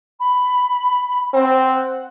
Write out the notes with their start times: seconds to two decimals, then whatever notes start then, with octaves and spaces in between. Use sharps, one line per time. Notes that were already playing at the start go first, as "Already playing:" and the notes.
0.19 B5
1.34 C4 F#5